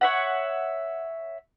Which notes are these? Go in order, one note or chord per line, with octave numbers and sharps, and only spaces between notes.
C#5 E5 F#5